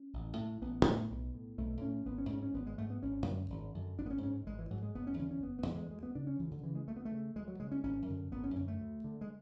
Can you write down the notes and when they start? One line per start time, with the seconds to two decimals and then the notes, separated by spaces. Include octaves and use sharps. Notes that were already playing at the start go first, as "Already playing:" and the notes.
Already playing: C#4
0.13 A1
0.38 A2
0.61 A1 B3
0.86 A2
1.10 B1
1.34 A2
1.58 B1 A3
1.82 A2 C#4
2.06 G#1 B3
2.18 C#4
2.30 G#2 C#4
2.43 C#4
2.54 G#1 B3
2.66 G#3
2.78 G#2 A3
2.90 B3
3.03 G#1 C#4
3.26 F#2 D3
3.50 G#1
3.75 F#2 D3
3.98 G#1 D4
4.06 B3
4.10 C#4
4.23 G#2 C#4
4.46 G#1 G#3
4.59 E3
4.70 G#2 F#3
4.83 G#3
4.95 F#1 B3
5.07 C#4
5.19 E2 D3 C#4
5.31 C#4
5.43 F#1 B3
5.59 B3
5.67 E2 D3
5.75 G#3
5.91 D2 G#3
6.03 B3
6.15 C#3 D4
6.27 C#4
6.40 D2 E3
6.51 D3
6.63 C#3 E3
6.75 G#3
6.88 D2 A3
6.96 B3
7.05 A3
7.11 C#3
7.36 D2 G#3
7.48 F#3
7.60 C#3 G#3
7.72 C#4
7.83 G#1 C#4
8.08 F#2 D3
8.32 G#1 B3
8.44 C#4
8.56 F#2 D3 C#4
8.68 A3
8.80 D2
9.04 D3
9.21 G#3